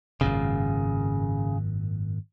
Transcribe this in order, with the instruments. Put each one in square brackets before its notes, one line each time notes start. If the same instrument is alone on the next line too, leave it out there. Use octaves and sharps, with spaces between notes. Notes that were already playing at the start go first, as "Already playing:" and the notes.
[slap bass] G#1 F#2 A#2 [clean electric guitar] C#3